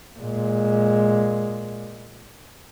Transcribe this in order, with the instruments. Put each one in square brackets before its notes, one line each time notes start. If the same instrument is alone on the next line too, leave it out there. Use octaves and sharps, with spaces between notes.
[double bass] A#2 G#3